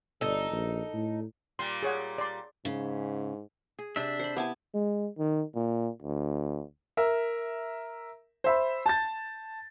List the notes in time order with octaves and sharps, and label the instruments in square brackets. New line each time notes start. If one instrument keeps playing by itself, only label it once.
[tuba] G1 [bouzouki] D#4 A4
[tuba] A#1
A2
[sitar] A#2 G3 [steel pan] C6
[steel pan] G#4 C#5 F#5
D5 C6
[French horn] G#2 [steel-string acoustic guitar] C#3
[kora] G#4
[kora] C3 [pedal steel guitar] D4 E5
[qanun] C5 B5
[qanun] B3 G#5 A5 [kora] E4 G4
[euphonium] G#3
D#3
A#2
D2
[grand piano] A#4 E5
C5 E5 B5
A5 G6 A6